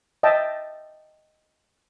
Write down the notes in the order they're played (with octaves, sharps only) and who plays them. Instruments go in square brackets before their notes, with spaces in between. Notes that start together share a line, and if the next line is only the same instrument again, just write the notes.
[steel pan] D#5 E5 G5 A5